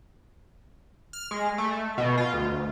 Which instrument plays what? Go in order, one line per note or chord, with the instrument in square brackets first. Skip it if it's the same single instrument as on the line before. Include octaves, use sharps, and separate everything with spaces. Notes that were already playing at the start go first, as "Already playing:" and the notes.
[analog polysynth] F6
G#3
A3
B2
F4
D2